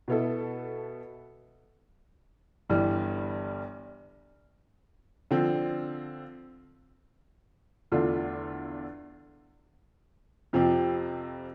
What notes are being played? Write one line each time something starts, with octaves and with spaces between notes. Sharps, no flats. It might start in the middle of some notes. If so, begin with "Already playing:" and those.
B2 B3 E4 A4
G1 G2 E3 G3
D3 F3 C4
E2 D3 A3 D4 F4
F2 C3 F3 C4 G4